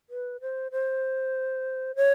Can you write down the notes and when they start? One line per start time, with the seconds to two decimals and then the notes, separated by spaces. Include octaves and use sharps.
0.10 B4
0.41 C5
0.72 C5
1.96 C#5